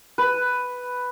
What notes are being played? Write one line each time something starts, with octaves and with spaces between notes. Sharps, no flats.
B4